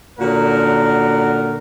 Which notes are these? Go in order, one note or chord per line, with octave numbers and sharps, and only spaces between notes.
A#2 D3 C#4 F#4 A#4 F#5